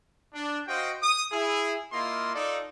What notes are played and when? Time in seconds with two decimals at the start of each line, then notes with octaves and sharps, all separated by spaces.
0.34 D4
0.68 F#4 C5 D#5 F5 G5
1.02 D#6
1.32 E4 G#4
1.93 A#3 E4 F4 D#5 C6
2.34 D#4 F4 A4 D5